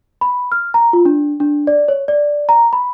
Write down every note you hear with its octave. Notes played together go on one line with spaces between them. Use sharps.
B5
F6
A#5
F4
D4
D4
D5
C#5
D5
A#5
B5